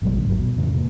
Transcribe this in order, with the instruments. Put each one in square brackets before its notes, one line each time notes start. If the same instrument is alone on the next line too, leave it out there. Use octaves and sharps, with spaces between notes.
[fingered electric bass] G#1 B2 F#3 G#3
A#1 A#2 D3
G#1 D#2 G#2 F#3
B2
F2 A2 C#3 E3
C3 A#3